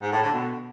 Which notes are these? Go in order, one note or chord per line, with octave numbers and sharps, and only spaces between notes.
G#2
A2
D3
B2